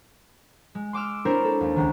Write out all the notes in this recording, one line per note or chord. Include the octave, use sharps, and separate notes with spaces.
G#3
C6 D6 E6 F6
C4 D4 E4 A#4 C5 C#5
A4
D#2
C#2 D#3